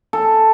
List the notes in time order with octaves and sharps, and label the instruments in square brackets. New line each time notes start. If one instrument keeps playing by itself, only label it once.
[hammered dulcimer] A4